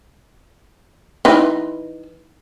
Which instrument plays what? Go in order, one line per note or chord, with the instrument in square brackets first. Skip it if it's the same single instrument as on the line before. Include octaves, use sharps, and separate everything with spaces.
[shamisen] E3 D#4 B4